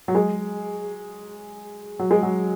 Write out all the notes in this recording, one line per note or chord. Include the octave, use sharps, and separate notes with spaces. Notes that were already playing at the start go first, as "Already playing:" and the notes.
F#3
G#3
F#3
G#3
F#3